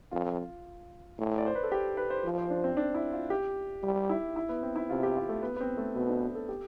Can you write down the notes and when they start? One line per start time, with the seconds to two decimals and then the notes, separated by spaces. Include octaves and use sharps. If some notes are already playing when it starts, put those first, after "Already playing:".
0.11 F2 F4
1.18 A2
1.38 D5
1.46 C5
1.55 B4
1.63 A4
1.72 G4
1.97 B4
2.10 C5
2.24 F3
2.38 C5
2.50 D4
2.64 C4
2.77 D4
2.94 E4
3.13 F4
3.30 G4
3.83 G3
4.09 E4
4.36 E4
4.49 B3
4.63 C4
4.76 E4
4.89 C3 F4
5.03 G4
5.17 F4
5.29 A3
5.42 B3
5.56 B3
5.61 C4
5.77 A3
5.95 B2 B3
6.09 D4
6.35 A4
6.49 G4